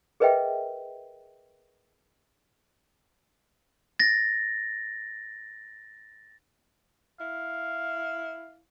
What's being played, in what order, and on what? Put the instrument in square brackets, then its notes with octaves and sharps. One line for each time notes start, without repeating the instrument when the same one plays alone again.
[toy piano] G#4 A#4 B4 D#5 E5 G5
[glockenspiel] A6 A#6
[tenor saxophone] E4 [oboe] F5